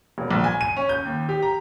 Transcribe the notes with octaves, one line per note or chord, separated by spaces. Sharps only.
E1
A#1
G#5
D#7
C#4
G6
D#2
G4
A#5